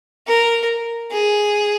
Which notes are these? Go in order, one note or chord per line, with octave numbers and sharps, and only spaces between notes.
A#4
G#4